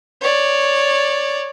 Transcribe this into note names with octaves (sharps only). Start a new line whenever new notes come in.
C#5 D5